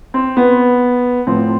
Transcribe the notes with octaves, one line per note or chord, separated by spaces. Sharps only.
C4
B3
A2 F3 C4